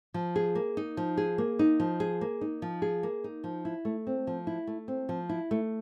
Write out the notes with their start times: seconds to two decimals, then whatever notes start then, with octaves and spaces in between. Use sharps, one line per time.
0.14 F3
0.36 G#4
0.55 A#3
0.77 D#4
0.97 F3
1.17 G#4
1.38 A#3
1.59 D#4
1.80 F3
2.00 G#4
2.21 A#3
2.41 D#4
2.62 F3
2.82 G#4
3.03 A#3
3.24 D#4
3.44 F3
3.65 E4
3.85 A3
4.07 C4
4.27 F3
4.47 E4
4.67 A3
4.88 C4
5.09 F3
5.29 E4
5.51 A3